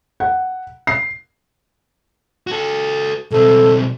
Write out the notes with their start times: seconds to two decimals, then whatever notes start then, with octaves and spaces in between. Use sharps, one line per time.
0.20 F#5
0.87 C7
2.47 F#4 A4
3.31 B1 C4 A4